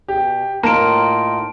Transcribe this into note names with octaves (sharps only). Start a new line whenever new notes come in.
B2 G4
A2 A#3 D#4 F4 A5 F6 D7 E7